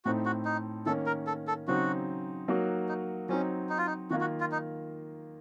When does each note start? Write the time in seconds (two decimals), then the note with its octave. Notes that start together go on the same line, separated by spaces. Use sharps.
0.05 A2 A3 C4 D#4 F#4
0.25 F#4
0.45 D#4
0.86 D#3 A#3 C#4 A4
1.06 A#4
1.27 A4
1.47 A4
1.68 C#3 F#3 C4 D#4 F#4
2.48 F#3 A#3 D#4 F#4
2.89 D#4
3.29 F#3 C4 C#4 D#4
3.69 D#4
3.78 F4
3.87 D#4
4.10 D#3 A#3 F4 F#4
4.21 F#4
4.40 F4
4.52 D#4